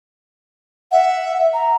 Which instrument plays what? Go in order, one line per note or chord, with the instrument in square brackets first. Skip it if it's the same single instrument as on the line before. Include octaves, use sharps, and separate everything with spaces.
[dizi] E5 [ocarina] F#5
[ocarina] A#5